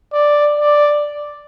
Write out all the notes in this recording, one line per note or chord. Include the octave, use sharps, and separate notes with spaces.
D5
D5